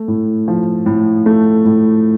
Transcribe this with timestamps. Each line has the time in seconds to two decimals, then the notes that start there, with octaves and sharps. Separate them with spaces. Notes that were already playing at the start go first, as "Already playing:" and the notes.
Already playing: A3
0.08 A2
0.48 F3
0.86 A2
1.26 A3
1.65 A2